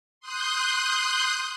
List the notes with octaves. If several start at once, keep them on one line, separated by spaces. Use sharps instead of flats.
C6 D#6 F#6 G6